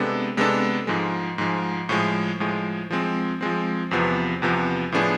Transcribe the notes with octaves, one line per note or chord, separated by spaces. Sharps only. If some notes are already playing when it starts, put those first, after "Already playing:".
Already playing: C3 G#3 B3 D4 A4
C3 G#3 B3 D4 A4
G#2 F3 G#3
G#2 F3 G#3
A2 F3 G#3
A2 F3 G#3
F3 G#3 C4
F3 G#3 C4
E2 C3 F3 B3
E2 C3 F3 B3
A2 F3 B3 D4 G#4